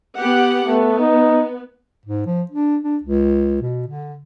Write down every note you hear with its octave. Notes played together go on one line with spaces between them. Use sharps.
B3 G4 F#5
A3 B3
D#4
G#2
F3
D4
D4
C#2
B2
D3